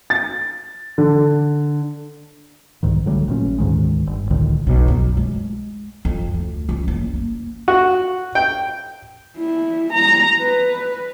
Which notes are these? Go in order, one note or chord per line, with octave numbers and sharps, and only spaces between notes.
A6
D3
C2 G#2 D#3
D3 F#3 G3 A3
A1 A#2 C#4
D2 G#2 D#3 G#3
G1
C#2 A2 D3 D#3
B1
F#2
G#3
F2
D2
C#2
F#1
A#3
F#4
G5
E4
A#5
B4